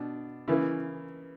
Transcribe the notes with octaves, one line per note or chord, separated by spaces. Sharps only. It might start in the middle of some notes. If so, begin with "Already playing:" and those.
Already playing: B2 D4
C#3 E3 A#3 E4